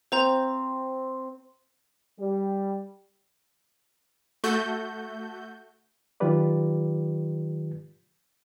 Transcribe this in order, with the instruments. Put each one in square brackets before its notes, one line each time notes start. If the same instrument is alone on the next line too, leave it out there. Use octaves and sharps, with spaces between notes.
[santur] C4 [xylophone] C5 A#5 G6
[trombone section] G3
[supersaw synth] A3 F#4 G6
[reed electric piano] D#3 F#3 F4 G4 B4 D5